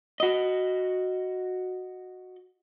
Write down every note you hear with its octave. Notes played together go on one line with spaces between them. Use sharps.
F#4 D#5